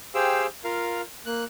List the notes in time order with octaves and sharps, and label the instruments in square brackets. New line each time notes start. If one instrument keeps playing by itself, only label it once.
[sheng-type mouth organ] G4 G#4 C5 F5 G5 E6
F4 A#4 F5
A#3 F#6